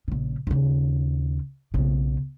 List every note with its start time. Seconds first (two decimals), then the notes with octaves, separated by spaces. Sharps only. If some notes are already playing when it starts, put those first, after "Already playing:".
0.08 A#1 C#3
0.47 D#2 C#3
1.74 B1 C#3